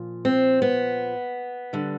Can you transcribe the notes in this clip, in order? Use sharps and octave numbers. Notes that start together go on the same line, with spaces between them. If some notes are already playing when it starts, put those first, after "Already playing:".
Already playing: A#2 F3
C4
B3
D3 G3